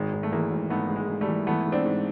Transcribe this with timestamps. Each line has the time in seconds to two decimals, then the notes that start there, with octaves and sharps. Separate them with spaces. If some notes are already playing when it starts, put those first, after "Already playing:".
Already playing: G#1 G#3
0.13 G#1
0.23 A3
0.32 E3 G#3 A#3
0.52 G#1
0.70 G#2 A3 B3
0.89 G#2
0.96 G#3
1.09 G#2
1.21 G3 A3
1.27 E3
1.47 E3 A3 B3
1.66 G#2
1.72 C4 D4
1.85 G#2